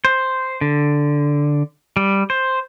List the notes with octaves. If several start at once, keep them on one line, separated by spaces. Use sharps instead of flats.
C5
D3
G3
C5